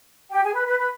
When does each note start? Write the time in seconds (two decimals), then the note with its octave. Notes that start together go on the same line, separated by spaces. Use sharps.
0.31 G4 G5
0.43 G#4 G#5
0.55 B4 B5
0.66 B4 B5
0.79 B4 B5